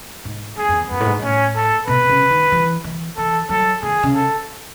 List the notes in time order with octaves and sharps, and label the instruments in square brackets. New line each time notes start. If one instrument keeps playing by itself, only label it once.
[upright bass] G#2
[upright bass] F#2 [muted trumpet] G#4
[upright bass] F#2
E2
[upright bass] F#2 [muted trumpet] B3
[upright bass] A2
G#2
[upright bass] A2 [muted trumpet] C#4
[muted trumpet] A4
[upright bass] B2 [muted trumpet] B4
[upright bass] C#3
D#3
E3
E3
[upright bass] E3 [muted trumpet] A4
[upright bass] F#3 [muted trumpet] A4
[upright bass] D#3 [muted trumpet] G#4
[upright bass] C#3
[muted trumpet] A4